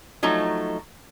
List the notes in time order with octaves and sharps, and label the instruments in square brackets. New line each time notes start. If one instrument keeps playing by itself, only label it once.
[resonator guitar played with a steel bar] F3 F#3 A3 D#4